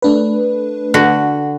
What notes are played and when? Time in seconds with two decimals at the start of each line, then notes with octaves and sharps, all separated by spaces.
0.02 A3 D4 B4
0.94 D3 F#4